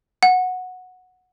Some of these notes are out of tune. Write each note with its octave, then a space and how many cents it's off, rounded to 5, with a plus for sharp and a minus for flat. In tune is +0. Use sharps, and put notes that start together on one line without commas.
F#5 -10